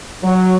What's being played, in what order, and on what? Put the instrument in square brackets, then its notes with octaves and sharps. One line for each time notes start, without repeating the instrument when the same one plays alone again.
[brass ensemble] F#3